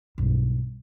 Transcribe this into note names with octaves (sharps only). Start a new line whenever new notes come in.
B1 G2